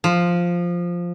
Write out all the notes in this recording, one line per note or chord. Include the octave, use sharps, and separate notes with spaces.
F3